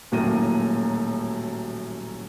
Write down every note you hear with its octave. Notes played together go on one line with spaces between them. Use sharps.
D#1 F#2 A2 A#3 A#5 D#7